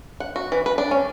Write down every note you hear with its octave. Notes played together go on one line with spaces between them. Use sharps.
F#5
F#4
E3
B4
D4
C#4